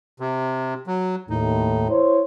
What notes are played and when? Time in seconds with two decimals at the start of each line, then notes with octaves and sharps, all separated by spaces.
0.20 C3
0.87 F#3
1.30 D#2 A2 D#4
1.89 E4 C5 C#5